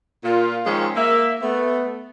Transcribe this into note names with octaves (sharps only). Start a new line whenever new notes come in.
A#2 F4
D#3 F3 G#3 C4 C#4
A#3 E5
A3 B3